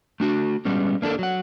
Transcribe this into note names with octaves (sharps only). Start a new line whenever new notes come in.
A3 D4 F#4
G3 G#3 B3 C#4
A#3 D4 E4 A4 A#4
F#3 F#5